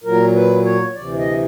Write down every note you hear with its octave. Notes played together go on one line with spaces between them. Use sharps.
A#2 F#3 A#4
B4
C#5
D2 C3 E3 D5
D#5